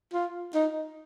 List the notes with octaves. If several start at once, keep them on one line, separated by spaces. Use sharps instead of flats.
F4
D#4